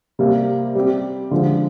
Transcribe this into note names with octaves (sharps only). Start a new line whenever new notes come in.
C3 G3 A#3
G3 C4 G4
D3 F3 G#3